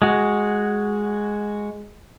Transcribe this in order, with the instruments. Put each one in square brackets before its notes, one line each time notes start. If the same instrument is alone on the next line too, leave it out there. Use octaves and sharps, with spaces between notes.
[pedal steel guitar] G#3 F#4